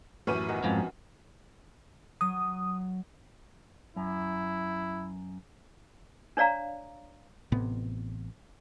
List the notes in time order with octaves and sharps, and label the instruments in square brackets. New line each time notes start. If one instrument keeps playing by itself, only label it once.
[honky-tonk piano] F#2 B4 D#7 [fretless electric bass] A2 E3 [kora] C#4 G4
[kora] D#3 F#3 B3
[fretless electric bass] A1 F3 [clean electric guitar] F2 G#2
[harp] F#3 [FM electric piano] D#6
[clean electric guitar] F#2 [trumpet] E4
[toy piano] D4 C#5 D5 F5 A#5
[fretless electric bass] A1 A2 C3 B3